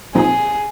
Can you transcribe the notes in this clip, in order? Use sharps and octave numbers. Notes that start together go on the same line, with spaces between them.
A#2 F3 C4 D#4 G#4